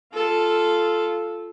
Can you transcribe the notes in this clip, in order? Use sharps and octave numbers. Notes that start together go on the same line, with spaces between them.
F4 A4